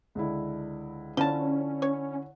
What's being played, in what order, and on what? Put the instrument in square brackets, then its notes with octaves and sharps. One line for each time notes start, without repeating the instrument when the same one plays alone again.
[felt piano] C#2 D3 E4
[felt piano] D3 E4 [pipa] F3 A5 [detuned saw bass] C#4
[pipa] C#5